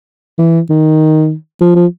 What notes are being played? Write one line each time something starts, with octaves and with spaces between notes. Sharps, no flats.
E3
D#3
F3
F3